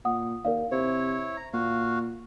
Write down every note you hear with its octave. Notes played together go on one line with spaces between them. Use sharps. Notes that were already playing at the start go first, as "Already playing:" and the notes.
A#2 F#5 D#6
D#2 A#4 D5 F5
C3 E4 C5 C#5
A#5
A#2 F#4 F5